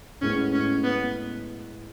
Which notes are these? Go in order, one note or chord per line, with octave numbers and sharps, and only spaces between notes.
A2 G#3 B3 C#4
C#4
B3